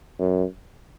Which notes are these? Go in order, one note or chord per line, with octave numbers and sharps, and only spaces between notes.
F#2